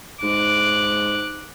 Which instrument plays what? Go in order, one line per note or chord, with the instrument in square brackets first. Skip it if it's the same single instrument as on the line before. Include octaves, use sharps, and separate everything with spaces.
[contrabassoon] G#2 [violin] D6 F#6